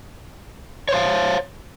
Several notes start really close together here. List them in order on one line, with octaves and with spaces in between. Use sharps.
C#5 C5 F5